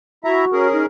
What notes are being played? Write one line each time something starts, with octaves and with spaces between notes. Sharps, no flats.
E4 F#4 E5 A#5
C#4 G#4 A#4
D#4